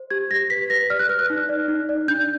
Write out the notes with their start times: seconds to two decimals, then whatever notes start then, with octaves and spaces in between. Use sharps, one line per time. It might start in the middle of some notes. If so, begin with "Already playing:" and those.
Already playing: C5
0.10 G4 G#6
0.30 G4 A#6
0.50 B4 B6
0.70 B4 A#6
0.90 D5 F6
0.99 F#6
1.09 B4 F6
1.19 F#6
1.30 D#4
1.49 D5
1.68 D#4
1.89 D5
2.08 D4 G6